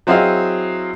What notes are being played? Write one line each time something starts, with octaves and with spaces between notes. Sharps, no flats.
F#3 C4 E4 G#4 D#5 F5